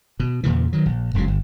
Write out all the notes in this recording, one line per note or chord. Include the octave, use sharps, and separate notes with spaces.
B2
E2 A#2 C#3 E3
D#3 F#3
A#1
F1 C#2 C#3 F#3
G1